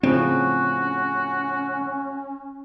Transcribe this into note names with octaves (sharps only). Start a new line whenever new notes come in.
A2 C#3 F3 C4 C#4 F#4